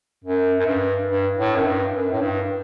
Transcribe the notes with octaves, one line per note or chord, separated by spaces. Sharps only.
F#2
F#2
G2
G2
A2
F#2
G2
F#2
A2
G2